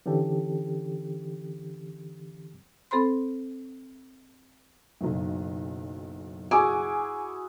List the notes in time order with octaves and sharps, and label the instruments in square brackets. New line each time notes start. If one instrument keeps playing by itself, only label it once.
[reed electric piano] D3 E3 C#4 G4 A4
[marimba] C4 A4 C5 B5 C6
[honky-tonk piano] F#1 B1
[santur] E4 F#4 G#4 [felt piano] G#5 D6